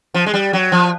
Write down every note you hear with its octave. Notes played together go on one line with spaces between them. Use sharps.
F3
G#3
G3
F#3
F3